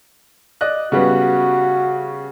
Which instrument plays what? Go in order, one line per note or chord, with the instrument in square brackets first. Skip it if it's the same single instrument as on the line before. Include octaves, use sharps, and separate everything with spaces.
[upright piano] D5 D#5 F#6
[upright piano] C#3 G3 B3 [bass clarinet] F#4